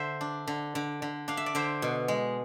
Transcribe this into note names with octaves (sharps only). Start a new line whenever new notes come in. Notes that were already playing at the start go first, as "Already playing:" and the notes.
Already playing: D3 C5 E5
D4
D3
D3
D3
D4 F5
E5
D5
D3 C5 E5
B2
G#3